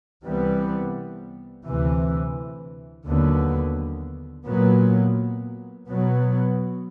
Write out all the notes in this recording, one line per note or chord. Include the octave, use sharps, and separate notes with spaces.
C2 C3 E3 G3 B3
D2 C3 E3
D#2 D3 F#3 B3
A#2 F#3 B3
B2 F#3 B3